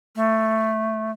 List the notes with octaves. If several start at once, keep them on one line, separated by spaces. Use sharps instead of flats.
A3